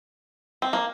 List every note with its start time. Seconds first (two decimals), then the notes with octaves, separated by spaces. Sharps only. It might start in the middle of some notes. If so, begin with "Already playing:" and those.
0.62 C4
0.73 A#3